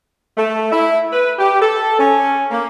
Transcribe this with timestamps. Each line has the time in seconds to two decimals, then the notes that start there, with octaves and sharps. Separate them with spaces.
0.37 A3
0.71 E4
1.12 B4
1.39 G4
1.61 A4
1.99 C#4
2.51 A#3